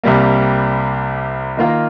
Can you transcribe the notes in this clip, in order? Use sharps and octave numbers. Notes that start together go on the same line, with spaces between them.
C2 C3 G3 A#3
D#3 A#3 F4 A#4